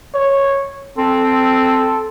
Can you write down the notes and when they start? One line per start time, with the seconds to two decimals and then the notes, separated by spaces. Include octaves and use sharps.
0.15 C#5
0.98 C4 A4